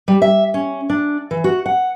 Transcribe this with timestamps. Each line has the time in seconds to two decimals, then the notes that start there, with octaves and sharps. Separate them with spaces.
0.08 G3
0.22 E5
0.54 C#4
0.90 D4
1.31 E3
1.44 F#4
1.66 F#5